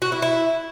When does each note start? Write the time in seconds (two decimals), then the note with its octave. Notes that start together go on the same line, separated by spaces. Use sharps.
0.02 F#4
0.12 E4
0.22 E4